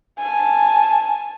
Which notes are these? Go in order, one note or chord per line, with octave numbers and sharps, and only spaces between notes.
G#5 A5